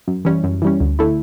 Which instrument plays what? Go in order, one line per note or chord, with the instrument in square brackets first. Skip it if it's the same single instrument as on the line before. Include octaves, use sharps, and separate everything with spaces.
[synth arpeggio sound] F#2
E3 G3 C#4
F#2
E3 G3 C#4
D2
D3 A3 E4